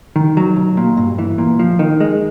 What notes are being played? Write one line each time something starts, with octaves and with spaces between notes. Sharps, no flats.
D#3
F#3
B1
A#2
G2
E3
A#2
F3
D#3
G#3